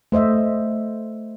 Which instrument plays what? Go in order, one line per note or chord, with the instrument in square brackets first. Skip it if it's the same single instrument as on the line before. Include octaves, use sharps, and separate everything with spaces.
[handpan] A3 C5 D#5 E5